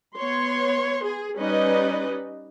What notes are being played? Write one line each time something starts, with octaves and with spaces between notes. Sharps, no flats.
B3 C#5 C6
G#4
G3 C#4 D#4 B4 D5 D#5